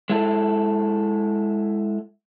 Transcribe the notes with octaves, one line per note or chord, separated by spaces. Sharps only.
G#3 E4 A4